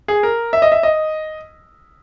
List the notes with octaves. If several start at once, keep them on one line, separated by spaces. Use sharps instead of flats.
G#4
A#4
E5
D#5
E5
D#5